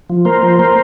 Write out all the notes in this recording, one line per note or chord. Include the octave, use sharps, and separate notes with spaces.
F3
A#3 A#4 C5
F3
A#3 A#4 C5